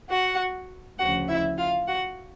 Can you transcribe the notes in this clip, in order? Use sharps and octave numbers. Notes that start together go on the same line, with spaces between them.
F#4 F#5
D2 C#3 F3 F#4 F#5
E4 E5
F4 F5
F#4 F#5